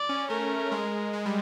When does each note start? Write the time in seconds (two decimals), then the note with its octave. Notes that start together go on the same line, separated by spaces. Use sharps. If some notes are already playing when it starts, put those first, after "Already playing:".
Already playing: D5
0.09 C#4
0.30 A3 A#4
0.72 G#3
1.13 G#3
1.26 G3